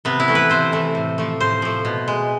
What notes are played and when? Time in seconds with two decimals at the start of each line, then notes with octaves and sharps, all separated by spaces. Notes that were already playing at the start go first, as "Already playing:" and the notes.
0.05 C3 B3
0.20 E4
0.28 E3 A3
0.35 B4
0.50 C3 C5
0.72 E3 A3
0.95 A2
1.18 F3 A3
1.40 A2 C5
1.62 F3 A3
1.85 B2
2.08 G#3